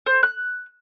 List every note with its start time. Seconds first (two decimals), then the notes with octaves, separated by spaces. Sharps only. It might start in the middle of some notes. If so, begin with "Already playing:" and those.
0.06 C5
0.23 F#6